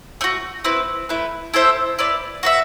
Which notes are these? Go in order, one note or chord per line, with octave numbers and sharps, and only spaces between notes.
A3 D4 F#4
C4 E4 B4
A3 E4 B4
E4 A4 C5 E5
E4 B4 D5
F#4 B4 E5